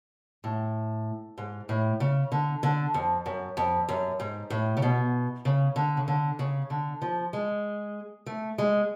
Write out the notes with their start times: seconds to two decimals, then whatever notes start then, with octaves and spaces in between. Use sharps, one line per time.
0.44 A2
1.38 G#2
1.69 A2
2.00 C#3
2.32 D3
2.63 D3
2.94 F2
3.26 F#2
3.57 F2
3.89 F#2
4.20 G#2
4.50 A2
4.77 C#3
4.82 B2
5.45 C#3
5.76 D3
5.97 C#3
6.08 D3
6.39 C#3
6.70 D3
7.02 F3
7.33 G#3
8.26 A3
8.58 G#3